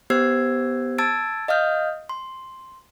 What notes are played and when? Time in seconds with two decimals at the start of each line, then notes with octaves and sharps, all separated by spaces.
0.10 B3 G4 C5 E6 G#6 C7
0.98 A5 E6 G#6 A6 D7
1.48 D#5 F5 D#6 F6 G6
2.09 C6